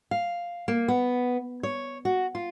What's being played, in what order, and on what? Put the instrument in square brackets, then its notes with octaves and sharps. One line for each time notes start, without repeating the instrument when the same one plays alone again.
[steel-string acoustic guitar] F5
A#3
B3
C#5
F#4
F4